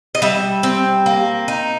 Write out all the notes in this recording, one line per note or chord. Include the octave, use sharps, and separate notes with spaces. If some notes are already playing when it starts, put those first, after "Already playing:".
D#5
G3 E5
C4
A#3
D#4